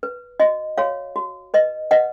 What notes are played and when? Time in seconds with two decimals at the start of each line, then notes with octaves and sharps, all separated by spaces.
0.03 B4
0.40 F#4 D#5
0.78 F#4 C#5 F5
1.16 F#4
1.54 B4 D#5
1.91 B4 D#5 F#5